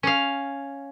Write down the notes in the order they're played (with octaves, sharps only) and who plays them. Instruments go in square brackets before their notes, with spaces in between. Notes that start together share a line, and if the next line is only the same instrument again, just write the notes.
[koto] C#4 F5